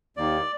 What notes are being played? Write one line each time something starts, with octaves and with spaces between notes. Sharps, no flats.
D#2 D#3 A#3 D5